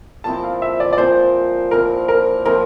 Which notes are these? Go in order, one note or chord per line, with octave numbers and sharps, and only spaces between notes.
A#2 F3 C4 E4 A5
F5
E5
D5
D5
A#2 F3 C4 E4 C5
A#2 F3 C4 E4 A#4
A#4
A#2 F3 C4 E4 A#4